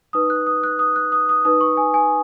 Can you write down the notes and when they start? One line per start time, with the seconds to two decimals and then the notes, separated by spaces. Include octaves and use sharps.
0.13 D#4 B4 D#6
0.30 F#6
0.47 D#6
0.64 F#6
0.79 D#6
0.96 F#6
1.12 D#6
1.29 D#6
1.45 D#4 B4 D#6
1.61 C#6
1.77 G#5
1.94 G#5